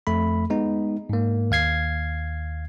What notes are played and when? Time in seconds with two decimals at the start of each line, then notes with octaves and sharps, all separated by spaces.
0.07 F2 A3 B5
0.50 G#3 B3 D#4
1.09 G#2 A#3
1.51 D#2 F5 G#6 C7